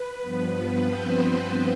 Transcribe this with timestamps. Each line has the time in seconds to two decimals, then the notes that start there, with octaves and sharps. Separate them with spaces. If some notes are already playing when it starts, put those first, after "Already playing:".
Already playing: B4
0.20 G2 F3 B3
0.83 C4 C5